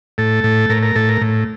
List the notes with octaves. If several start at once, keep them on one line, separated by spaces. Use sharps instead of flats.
A2 A4
A2
A2 A#4
A#4
A2 A4
A#4
A2